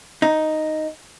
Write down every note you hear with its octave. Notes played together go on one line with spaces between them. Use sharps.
D#4